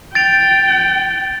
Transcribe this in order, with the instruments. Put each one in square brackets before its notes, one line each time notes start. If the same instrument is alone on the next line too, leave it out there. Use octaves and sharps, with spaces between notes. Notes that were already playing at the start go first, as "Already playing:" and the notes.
[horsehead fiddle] G5 [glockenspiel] A6 D7 F7